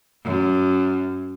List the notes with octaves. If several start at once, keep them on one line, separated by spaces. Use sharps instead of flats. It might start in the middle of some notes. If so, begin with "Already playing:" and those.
F#2